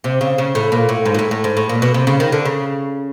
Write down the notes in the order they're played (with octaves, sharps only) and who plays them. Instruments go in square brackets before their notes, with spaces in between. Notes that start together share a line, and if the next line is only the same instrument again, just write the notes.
[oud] C3
C#3
C#3
A2
A#2
A2
G#2
A#2
A2
A2
G#2
A2
A#2
B2
C3
C#3
D#3
D3
C#3